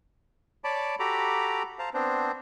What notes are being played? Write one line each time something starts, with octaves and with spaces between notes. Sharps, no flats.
C#5 D5 A5 B5 D6
F#4 G4 A4 A#5 B5 D6
C5 F5 A5 A#5
B3 C4 D4 C5